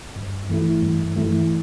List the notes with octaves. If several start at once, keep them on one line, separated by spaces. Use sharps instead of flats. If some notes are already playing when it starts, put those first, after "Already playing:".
G2
E3 A3 E4
G2
E3 A3 E4